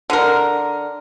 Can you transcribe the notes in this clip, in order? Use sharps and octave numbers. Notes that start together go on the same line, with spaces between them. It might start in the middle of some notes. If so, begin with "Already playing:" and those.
D3 A#4